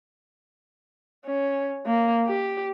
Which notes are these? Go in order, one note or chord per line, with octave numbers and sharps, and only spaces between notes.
C#4
A#3
G4